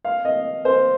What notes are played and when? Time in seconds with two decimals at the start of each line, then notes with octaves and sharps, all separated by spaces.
0.05 F5
0.25 D#5
0.65 C5